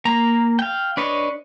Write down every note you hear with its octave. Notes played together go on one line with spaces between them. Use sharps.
A#3 A#5
F5 G5
D4 B4 C#5 D#5